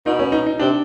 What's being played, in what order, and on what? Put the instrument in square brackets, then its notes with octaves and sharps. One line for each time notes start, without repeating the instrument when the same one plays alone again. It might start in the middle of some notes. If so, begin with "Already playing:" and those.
[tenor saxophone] B2 [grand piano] D#4
[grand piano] C#4
D#4
D#4
[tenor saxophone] C3 [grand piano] D4